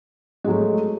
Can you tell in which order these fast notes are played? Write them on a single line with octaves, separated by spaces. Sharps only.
G#3 F#3 A3